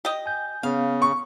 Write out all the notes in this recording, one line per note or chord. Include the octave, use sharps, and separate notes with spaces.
G4 D#5
G#5 G6
C#3 B3 F5
C#6